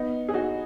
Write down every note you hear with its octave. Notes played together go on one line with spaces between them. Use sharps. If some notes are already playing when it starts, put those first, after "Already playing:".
Already playing: B3 D#4
G#4
D#4 F#4